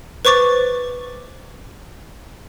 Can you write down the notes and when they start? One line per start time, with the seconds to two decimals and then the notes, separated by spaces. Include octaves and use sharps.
0.25 B4 C5 C#6 D6 A6